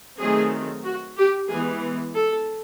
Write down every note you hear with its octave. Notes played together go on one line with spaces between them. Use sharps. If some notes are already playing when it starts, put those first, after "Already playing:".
D#3 F#3 A3 C4 G#4
F#4
G4
E3 G#3 B3 G#4
A4